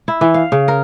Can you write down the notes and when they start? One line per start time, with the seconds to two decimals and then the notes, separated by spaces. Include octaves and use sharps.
0.08 E4
0.21 E3
0.34 F5
0.52 C#3
0.68 A#4